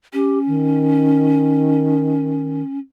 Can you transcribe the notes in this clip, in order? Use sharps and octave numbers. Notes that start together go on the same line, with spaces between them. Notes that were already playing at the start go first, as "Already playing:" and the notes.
C#4 G4
D#3